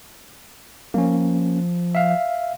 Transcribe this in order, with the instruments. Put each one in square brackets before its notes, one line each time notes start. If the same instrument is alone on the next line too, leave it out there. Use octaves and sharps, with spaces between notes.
[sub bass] F3 [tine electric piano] A#3 C#4
[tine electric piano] E5 F5